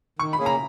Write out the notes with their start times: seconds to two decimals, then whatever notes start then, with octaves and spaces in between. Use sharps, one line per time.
0.19 D#3 C#6
0.33 B5
0.39 A#3 C#4 G#4
0.46 A#5